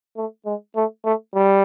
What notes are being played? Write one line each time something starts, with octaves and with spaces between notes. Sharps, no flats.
A3
G#3
A3
A3
G3